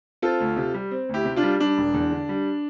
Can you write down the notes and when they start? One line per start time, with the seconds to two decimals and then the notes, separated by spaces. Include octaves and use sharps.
0.22 C4 F4 A4
0.40 D2
0.57 C3
0.74 G3
0.91 C4
1.09 D2 E4 G4
1.25 C3
1.36 D4 F4
1.43 G3
1.60 G3 D4
1.78 E1
1.94 E2
2.11 D3
2.29 G3